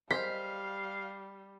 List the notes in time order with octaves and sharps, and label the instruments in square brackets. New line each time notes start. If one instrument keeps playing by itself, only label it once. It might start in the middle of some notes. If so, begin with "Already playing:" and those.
[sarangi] G3 [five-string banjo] C5 [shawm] F5 [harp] B6